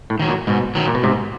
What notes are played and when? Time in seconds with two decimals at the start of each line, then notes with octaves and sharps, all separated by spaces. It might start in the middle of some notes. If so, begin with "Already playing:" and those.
0.10 A2
0.19 D#3 F#3
0.29 A#2
0.47 G#2 B2
0.75 D#3 F#3
0.88 A#2
0.95 B2
1.03 G#2 C3